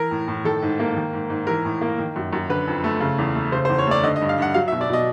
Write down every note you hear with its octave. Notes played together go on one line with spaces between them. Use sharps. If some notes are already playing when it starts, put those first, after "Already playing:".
Already playing: E3 A#4
A2
A2
D#3 A4
G#2
A#3
D#3
G#2
G#2
E3 A#4
A2
A#3
D#3
F#2
F#2
D3 B4
F2
A3
C#3
E2
A3
C#3 C5
C5
E2
C#5
A3 D5
D3 D#5
D#5
G2
F5
G2 F#5
F#3 F5
E5
B2
D5
B2 D#5